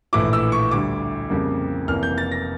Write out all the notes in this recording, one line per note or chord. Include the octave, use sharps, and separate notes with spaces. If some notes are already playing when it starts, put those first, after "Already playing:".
A#1 A2 E3 A3 E4 D6
E6
C#6
D2 D3 G3 D6
F2 C#3 G3 A#3
F1 F2 E3 A#3 F6
G6
A6
A#6